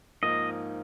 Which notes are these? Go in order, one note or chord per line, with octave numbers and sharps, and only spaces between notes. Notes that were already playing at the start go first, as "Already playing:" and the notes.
G#2 F3 A#3 D#4 D#5